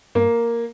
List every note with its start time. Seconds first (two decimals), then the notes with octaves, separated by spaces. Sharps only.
0.15 G2 A#3